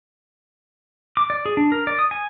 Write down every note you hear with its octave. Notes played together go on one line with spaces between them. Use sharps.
D6
D5
G#4
D4
A#4
D5
D#6
G#5